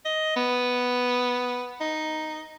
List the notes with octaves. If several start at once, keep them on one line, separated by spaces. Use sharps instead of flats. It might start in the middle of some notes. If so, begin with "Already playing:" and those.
D#5
B3
D#4